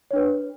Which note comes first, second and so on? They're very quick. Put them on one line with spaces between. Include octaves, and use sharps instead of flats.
C#5 D4 B4